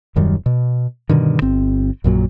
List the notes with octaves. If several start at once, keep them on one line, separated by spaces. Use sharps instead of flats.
D#1 F#2 D#3 G3
B2
G2 B2 D3 D#3
G1 C4
A#1 F#2 A#2 F#3